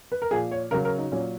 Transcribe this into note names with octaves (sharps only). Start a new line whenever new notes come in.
B4
A#4
A#2 F3 G#4
C#5
C#3 F#3 A#4
A#4
D#4
A#2 F#3 C#4